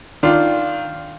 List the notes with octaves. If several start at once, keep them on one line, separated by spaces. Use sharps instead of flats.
D#3 D4 F4